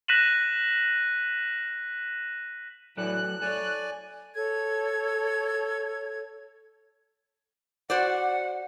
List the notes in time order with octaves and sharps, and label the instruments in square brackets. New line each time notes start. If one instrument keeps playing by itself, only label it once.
[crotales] F#6 A#6 B6 D#7 E7 F#7
[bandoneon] A2 E3 [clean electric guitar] F#3 A4 D5 [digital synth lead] F#6
[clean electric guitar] A4 C#5 [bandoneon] D5 G#5
[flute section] A4 C#5 G#6
[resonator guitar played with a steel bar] F#4 C5 D5 [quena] F#5